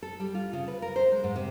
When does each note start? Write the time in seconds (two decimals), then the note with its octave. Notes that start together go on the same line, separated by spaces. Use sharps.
0.03 A4
0.20 G3
0.35 F4
0.53 C#3
0.68 B4
0.82 A#4
0.96 C5
1.12 G#3
1.24 G#2
1.36 C3